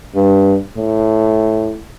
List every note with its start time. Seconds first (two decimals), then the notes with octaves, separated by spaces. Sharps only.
0.15 G2
0.77 A2